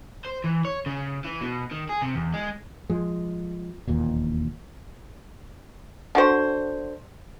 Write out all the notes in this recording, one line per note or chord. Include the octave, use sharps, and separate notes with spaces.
C5
E3
C#5
C#3
E3
B2
D#3
G#4
C3
E2
G#3
F3 G#3
E1 D#2 A#2
D3 F#4 C5